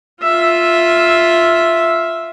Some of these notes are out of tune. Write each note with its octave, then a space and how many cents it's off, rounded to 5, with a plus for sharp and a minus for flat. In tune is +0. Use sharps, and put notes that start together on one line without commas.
F4 +0 E5 +0